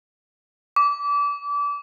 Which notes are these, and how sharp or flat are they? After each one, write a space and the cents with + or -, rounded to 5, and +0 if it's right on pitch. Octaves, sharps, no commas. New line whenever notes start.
D6 -30